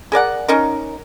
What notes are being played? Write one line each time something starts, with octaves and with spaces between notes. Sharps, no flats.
G#4 A#4 D5 F#5
C#4 D#4 A#4